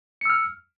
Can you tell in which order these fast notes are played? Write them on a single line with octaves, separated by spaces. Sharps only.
C#7 E6 F6